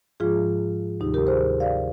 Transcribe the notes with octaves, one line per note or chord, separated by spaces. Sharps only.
G#2 F3 G#3 F4 G#4
D2 C3 D#3 G3 D#4 G4
G4 A#4
G#4 C5
D5 F5